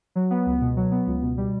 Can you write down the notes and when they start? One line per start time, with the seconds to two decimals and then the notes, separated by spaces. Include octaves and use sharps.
0.16 F#3
0.31 B3
0.46 C#2
0.61 B2
0.77 F#3
0.92 B3
1.07 C#2
1.22 B2
1.37 G3